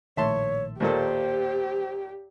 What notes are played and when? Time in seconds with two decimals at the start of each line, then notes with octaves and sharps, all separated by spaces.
0.17 A#1 A2 D#3 C#5 E5 A5 C6
0.80 D#2 A#2 G4 A4 C5